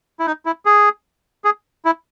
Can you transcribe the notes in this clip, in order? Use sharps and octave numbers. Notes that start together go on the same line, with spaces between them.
E4
D#4
E4
G#4
G#4
E4